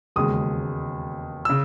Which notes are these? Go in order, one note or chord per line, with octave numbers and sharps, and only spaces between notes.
E1 D#2 C#3 G#3 D#6
C#3 E6